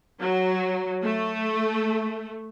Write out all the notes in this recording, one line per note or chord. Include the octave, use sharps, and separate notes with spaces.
F#3
A3